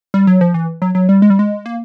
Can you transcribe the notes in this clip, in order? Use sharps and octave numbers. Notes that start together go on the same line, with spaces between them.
G3
F#3
F3
E3
F#3
F#3
G3
G#3
G3
G#3
A#3